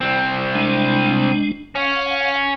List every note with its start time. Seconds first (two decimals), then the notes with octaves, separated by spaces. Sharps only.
0.01 C2 C4
0.55 G#3 D4
1.76 C#4 F5 F#5